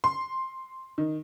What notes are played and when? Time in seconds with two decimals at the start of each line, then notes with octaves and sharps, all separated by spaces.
0.04 C6
0.98 D#3